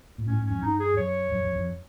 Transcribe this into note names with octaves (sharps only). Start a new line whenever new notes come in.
A#2
A2 C#4
G#2
C#4
F2
G2 D#4
G#4
F#2 C#5
F#2
F2
F2